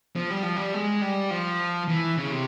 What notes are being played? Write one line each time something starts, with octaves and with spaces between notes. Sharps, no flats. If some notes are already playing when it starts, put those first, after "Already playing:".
F3
G3
F3
G3
G#3
G3
F3
E3
C#3
C3